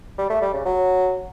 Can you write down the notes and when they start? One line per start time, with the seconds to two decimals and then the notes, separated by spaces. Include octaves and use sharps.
0.18 G3
0.30 A3
0.42 G3
0.53 C#3
0.65 F#3